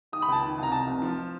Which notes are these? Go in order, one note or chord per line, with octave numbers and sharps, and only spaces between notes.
D#3 D#6
B5
C#2 A5
D#3
C2
A#5
C3 A5
F1
F3